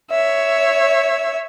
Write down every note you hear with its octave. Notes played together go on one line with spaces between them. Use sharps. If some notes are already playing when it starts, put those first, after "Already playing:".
C#5 E5